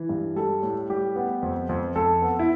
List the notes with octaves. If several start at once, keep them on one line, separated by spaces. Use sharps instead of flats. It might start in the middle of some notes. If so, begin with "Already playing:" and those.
Already playing: E3
G2
G3 A4
A2
G3 G4
B3
F2
F2
F2 A4
B3
E4